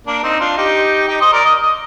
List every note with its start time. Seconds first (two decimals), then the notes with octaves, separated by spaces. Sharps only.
0.07 A#3 D4
0.23 C4 D#4
0.40 D4 F4
0.57 D#4 G4
1.08 D#4 G4
1.21 C5 D#5
1.32 A#4 D5
1.45 D#5
1.62 D#5